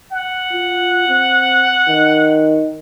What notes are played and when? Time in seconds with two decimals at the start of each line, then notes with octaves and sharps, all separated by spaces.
0.11 F#5
0.53 F4
1.09 C4
1.89 D#3